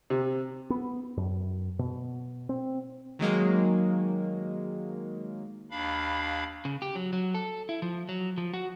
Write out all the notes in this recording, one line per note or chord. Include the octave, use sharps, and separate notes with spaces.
C3
B3
F#2
B2
C4
D#3 F#3 G#3 A#3
D#2 D4 F5 B5
C#3
G4
F#3
F#3
A4
E4
F3
F#3
F3
F#4